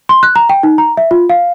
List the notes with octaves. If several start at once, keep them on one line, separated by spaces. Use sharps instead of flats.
C6
F#6
A#5
G5
D#4
A#5
E5
F4
F5